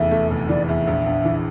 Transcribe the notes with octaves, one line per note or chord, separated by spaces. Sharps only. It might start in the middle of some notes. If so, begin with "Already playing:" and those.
Already playing: F1 E2 E3 A3 E5
A3
F1
E3 D5
E2 E5
A#1
A#1
E3